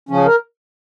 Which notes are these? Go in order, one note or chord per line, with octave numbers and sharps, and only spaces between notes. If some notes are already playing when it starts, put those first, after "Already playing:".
C#3 F3 C#4
A#4